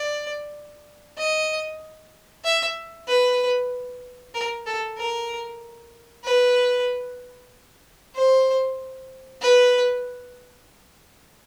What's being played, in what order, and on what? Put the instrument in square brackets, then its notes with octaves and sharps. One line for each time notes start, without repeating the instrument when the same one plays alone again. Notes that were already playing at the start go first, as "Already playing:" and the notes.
Already playing: [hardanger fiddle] D5
D#5
E5
B4
A#4
A4
A#4
B4
C5
B4